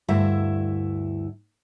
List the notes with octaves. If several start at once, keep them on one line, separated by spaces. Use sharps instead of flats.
D2 G2 E4 E5